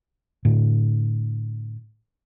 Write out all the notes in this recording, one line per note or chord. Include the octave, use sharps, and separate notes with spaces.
A2 D3